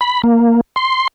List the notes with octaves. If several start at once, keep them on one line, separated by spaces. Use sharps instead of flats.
B5
A#3
C6